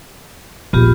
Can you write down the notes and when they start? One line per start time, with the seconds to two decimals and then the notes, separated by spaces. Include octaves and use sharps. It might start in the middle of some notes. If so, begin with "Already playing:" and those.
0.73 A#1 D#2 B3 F4 G4